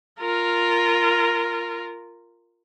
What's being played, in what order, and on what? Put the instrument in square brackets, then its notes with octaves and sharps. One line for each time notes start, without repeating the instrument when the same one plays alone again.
[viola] F4 A#4